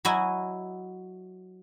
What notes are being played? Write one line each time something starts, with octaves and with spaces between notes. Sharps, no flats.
F#3 E4 F#4 D#5 G#5